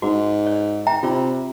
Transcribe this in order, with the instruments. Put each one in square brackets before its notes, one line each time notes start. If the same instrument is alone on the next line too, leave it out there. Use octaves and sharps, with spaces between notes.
[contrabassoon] G#2 [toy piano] F#4
[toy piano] D5
E5 G5 A#5
[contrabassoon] C3 [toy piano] F4 D5